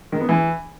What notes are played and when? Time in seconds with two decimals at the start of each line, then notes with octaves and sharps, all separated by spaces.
0.12 D#3
0.21 B3
0.29 E3